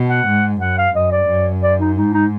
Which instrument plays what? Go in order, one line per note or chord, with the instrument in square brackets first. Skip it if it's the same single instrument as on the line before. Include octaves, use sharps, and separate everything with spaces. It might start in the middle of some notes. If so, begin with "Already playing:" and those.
Already playing: [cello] B2
[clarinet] F#5
[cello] G#2
[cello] F#2 [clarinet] F#5
[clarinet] F5
[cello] F#2 [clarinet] D#5
[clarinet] D5
[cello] F#2
[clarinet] D5
D#4
[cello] G#2 [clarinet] D#4
[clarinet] D#4